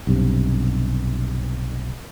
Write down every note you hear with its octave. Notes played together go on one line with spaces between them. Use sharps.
B1 G2 C3